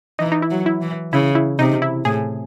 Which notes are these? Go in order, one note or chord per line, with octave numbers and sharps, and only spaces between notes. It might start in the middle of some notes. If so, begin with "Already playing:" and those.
E3 D#4
D#4
E4
F#3
E4
E3
C#3 E4
E4
C3 D#4
E4
A2 G#4